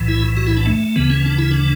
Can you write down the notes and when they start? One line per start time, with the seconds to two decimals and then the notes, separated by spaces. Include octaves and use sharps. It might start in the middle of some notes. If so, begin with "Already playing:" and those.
Already playing: B1 A2 E3
0.08 E4
0.37 F#4
0.47 E4
0.57 D4
0.66 A3
0.96 D2 C#3 E3 B3
1.10 C#4
1.26 D4
1.38 E4
1.51 D4